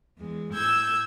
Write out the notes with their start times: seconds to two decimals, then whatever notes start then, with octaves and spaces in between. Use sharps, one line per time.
0.17 E2 G#3
0.54 A2 E6 G6 G#6